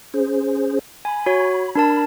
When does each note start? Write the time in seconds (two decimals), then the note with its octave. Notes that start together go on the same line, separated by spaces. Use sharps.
0.14 C#4 G#4 C5
1.05 G#5 B5
1.26 F#4 C#5
1.75 D4 A#4 A5